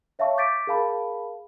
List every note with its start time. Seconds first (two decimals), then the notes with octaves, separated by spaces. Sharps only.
0.19 C#5 E5 F5 A5 C#6
0.37 D6 G6 A6 B6 D7
0.67 G#4 A#4 F5 A5 B5